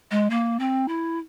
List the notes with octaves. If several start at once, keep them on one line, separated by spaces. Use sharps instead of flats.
G#3
A#3
C4
E4